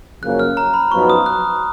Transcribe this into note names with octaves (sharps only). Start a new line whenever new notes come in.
F#2 C#3 F3 A#3 C#4 F#6
F6
A#5
B5
F#2 F3 B3 D#4 F#4 C#6
D#6
F#6